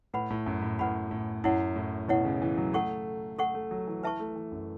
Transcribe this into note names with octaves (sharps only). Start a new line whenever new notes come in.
A2 B4 F#5 B5
A2
F#2
A2
A2 B4 F#5 B5
A2
F#2 E4 C#5 F#5
A2
B2 E4 C#5 F#5
C#3
E3
F#3
A3 A4 F#5 C#6
A3 A4 F#5 C#6
A3
F#3
E3
E3 B4 E5 A5 C#6
A3
E3
F#2